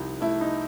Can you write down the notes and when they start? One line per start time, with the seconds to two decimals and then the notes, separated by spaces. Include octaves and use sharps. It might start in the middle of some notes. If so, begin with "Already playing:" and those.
Already playing: C2 F3 D#4
0.21 A3 E4
0.41 D#4